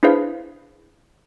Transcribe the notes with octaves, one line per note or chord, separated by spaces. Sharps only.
D4 E4 G#4 B4 C5 F5